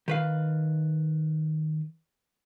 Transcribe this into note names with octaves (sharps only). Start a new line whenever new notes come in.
D#3 B4 F5